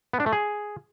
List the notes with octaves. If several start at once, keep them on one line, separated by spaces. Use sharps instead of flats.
B3
D4
A3
G#4